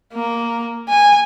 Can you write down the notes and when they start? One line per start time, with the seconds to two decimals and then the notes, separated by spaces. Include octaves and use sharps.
0.13 A#3
0.89 G#5